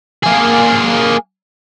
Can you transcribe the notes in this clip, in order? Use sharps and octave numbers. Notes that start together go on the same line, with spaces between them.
A#3 G#4